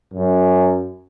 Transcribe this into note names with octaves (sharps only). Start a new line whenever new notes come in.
F#2